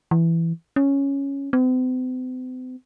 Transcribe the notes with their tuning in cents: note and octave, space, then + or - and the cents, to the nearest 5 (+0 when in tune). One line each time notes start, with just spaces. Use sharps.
E3 +10
C#4 +0
C4 -45